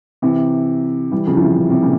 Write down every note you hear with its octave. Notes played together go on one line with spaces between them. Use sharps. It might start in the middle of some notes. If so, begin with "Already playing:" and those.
C3 E3
E3 G3
C#3 F3
F3
C3 E3
C#3
C3
A#2 C#3